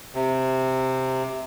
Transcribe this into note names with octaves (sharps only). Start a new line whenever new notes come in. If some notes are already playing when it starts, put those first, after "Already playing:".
C3